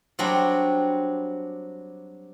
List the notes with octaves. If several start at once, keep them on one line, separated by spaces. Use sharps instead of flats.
F#3 G3 C4 D4 F#4